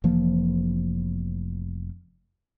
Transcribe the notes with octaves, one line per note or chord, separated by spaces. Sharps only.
F1 E3 F3 A#3